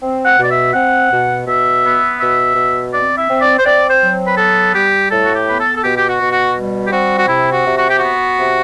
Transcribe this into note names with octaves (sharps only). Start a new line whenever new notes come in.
C4
F#5
B2 D5
E5
C4 F#5
B2
B2 E5
B3
B2 E5
B2
C4 D5
E5
C4
D5
C5
C4 D5
C5
F#3
B4
B3 A4
G3 G4
A2 A4
F#4
G4
B3 B4
A4
A4
B2 G4
G4
F#4
B2
F#4
G3
G4
C4 F#4
F#4
C3 E4
F#4
C3
F#4
G4
B3 F#4
C3